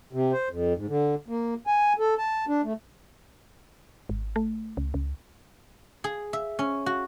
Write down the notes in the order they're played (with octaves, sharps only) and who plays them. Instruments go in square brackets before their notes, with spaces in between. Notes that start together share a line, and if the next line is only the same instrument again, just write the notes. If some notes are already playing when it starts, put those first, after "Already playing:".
[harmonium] C3
C5
F2
G#2
D3
A#3
G#5
A4
A5
D4
A3
[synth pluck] G#1
A3
C#2
C#2
[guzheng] G#4
E5
C#4
F#4